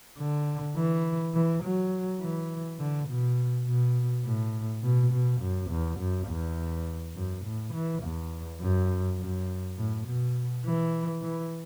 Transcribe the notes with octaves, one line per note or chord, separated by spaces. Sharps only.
D3
E3
E3
F#3
E3
D3
B2
B2
A2
B2
B2
F#2
E2
F#2
E2
F#2
A2
E3
E2
F#2
F#2
A2
B2
E3
E3